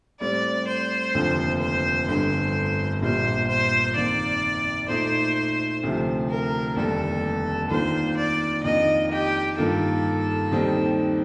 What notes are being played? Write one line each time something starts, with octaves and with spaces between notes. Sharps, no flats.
A2 G3 C4 D5
C5
F1 D#2 D3 F3
C5
G1 G2 D3 C5
A#1 A#2 G3 A#3 F4 C5
C5
F2 D#3 A#3 D5
A#2 A3 D#4 C5
D2 C3 F3
A#4
F1 D#2 D3 G3 D4 A4
D#2 D#3 A#3 D4 F4 C5
D5
F2 D#3 A#3 D4 F4 D#5
G4
G2 D#3 A#3 F4 A4
D#2 D#3 G3 C4 D#4